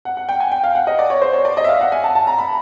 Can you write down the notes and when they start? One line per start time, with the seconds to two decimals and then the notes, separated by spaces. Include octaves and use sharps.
0.05 F#5
0.17 F#5
0.29 G5
0.40 G#5
0.52 G5
0.64 F5
0.75 F#5
0.87 D#5
0.99 D5
1.10 C#5
1.22 C5
1.33 C#5
1.45 D5
1.57 D#5
1.64 E5
1.69 F5
1.81 F#5
1.92 G#5
2.04 A5
2.15 A5
2.27 A#5
2.38 B5